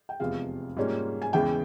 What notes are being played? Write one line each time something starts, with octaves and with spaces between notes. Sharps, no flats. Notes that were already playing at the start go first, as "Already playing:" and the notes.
G5
F1 E2 C3 F3 G#3 F5
G#2 G3 A#3 C#4 F4
G#5
E2 C#3 E3 G#3 G5